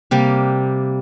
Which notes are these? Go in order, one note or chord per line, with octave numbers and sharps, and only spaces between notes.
C3 G3 A#3